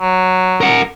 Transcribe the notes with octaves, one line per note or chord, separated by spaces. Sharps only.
F#3
A#4 F#5